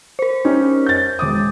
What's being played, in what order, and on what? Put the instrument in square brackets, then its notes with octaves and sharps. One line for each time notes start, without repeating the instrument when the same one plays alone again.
[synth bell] A#4 C5
[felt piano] C#4 D#4 G4
G6 A6
E1 D6 D#6